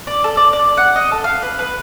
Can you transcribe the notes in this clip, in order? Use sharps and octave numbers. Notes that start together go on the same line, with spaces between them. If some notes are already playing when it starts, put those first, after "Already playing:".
D5
A4
D5
D5
F#5
D#5
A4
F5
B4
B4